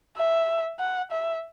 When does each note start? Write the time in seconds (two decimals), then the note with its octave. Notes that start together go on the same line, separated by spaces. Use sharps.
0.17 E5
0.80 F#5
1.11 E5